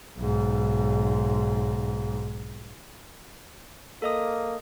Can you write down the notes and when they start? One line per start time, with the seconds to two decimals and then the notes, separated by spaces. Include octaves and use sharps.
0.18 B1 G#2
4.02 A#3 A4 D#5 D#6